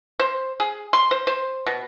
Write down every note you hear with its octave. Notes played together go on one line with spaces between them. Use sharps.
C5
G#4
C6
C5
C5
B2